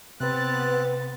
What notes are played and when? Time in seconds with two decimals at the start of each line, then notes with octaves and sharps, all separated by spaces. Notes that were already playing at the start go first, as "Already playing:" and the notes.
0.20 C3 B3 C4 B4 F#6 A6